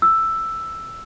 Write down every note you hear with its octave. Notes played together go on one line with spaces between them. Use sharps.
E6